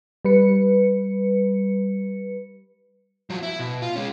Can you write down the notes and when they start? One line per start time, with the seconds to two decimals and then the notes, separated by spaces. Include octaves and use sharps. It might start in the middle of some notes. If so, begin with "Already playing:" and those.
0.25 G3 B4 C#7
3.30 F3 F#3
3.43 E4
3.59 B2
3.82 F4
3.96 G#3 C#4